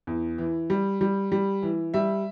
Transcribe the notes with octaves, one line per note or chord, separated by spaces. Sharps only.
E2
E3
G3
G3
G3
E3
G3 E5